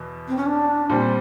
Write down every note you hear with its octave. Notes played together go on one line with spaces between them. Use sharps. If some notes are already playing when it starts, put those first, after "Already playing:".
Already playing: E2 B2
C4
C#4
D4
A#2 G3 C4